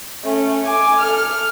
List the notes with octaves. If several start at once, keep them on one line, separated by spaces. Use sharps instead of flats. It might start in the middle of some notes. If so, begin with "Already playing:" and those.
A3 C#4
G#5 D6
A4 F6